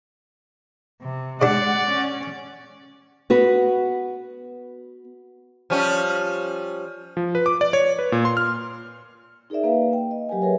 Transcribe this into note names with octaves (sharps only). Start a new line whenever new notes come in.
C3
C3 G#3 D4 D5 F#5
C#4
B3 F#4 B4
F3 G3 C#4
F3
B4
D6
D5
C#5
B4
A#2
C6
F6
D#4 G#4 A#4 D5 E5
A#3 B4 F5
G5
D#5
F#3 G4 A#4 G#5
G#4 A#4 B4 C#5 E5